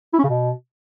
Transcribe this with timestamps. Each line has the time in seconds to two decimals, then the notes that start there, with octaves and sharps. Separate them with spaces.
0.14 E4
0.19 C#4
0.24 C#3
0.29 B2